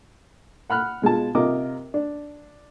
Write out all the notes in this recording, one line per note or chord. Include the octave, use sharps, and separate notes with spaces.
F#5 B5 F6 F#6
B2 G#3 F4 A5
C3 F4 A#4 D#5 D6
D4